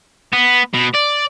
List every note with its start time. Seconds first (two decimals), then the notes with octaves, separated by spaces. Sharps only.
0.33 B3
0.74 B2
0.95 D5